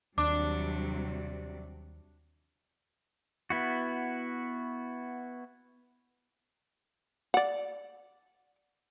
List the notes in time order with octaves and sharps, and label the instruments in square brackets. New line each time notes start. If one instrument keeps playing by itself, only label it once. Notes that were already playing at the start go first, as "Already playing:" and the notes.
[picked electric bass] D#2 [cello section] C3 F#3 G3 [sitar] D4 [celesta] D6
[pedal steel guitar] B3 E4 F#4
[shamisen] D5 F#5